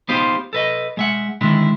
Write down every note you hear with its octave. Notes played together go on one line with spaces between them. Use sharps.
B3 D#4 F4 G4 C5
A4 B4 D#5
G#3 E5 F#5
D3 D#3 G#3 E4